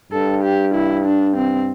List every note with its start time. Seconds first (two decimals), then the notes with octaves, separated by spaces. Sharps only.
0.12 G2 A4
0.43 G4
0.75 E4
1.06 D4
1.37 C4